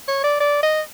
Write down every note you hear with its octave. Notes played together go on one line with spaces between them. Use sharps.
C#5
D5
D5
D#5